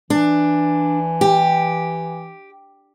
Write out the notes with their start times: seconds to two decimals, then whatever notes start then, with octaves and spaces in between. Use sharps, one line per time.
0.10 E3 D4
1.21 G4